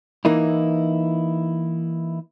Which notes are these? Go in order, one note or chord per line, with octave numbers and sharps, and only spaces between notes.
E3 A#3 D#4 E4